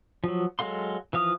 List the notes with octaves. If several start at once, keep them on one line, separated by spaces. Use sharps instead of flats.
F3 F#3
F#3 G#3 A4 F5 C6
E3 F3 F5 D#6